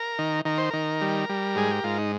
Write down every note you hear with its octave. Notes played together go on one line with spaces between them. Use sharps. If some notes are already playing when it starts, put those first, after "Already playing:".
Already playing: A#4
D#3
D#3 A#4
C5
D#3 A#4
G3
G3
G#2 G#4
G4
G#2 F4
D#4